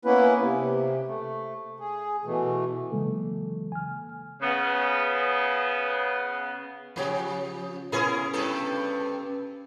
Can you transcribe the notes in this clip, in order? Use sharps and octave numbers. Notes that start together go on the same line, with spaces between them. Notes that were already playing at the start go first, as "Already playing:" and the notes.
A#3 B3 C#4 E4 B4
C3
A3
G#4
B2 E3 A3
C#3 E3 F#3 G#3 A#3 A4
G#5 F6
C#3 B3
C#3 F3 C#4 G4
C#3 B3 C#4 E4 G#4 A#4
G2 C3 A4